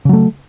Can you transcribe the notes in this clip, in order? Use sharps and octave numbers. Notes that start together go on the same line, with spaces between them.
C#3 F#3 A3